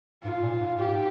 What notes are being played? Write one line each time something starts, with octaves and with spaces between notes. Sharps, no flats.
G#2 F4
A#2
G#2
G#2 G4